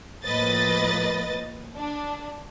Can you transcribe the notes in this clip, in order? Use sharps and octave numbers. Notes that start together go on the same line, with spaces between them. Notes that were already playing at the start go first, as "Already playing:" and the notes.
A2 F3 A#3 B4 D#5 A6
D4